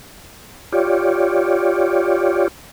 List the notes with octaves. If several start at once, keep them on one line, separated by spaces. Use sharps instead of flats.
F4 G4 C#5 D5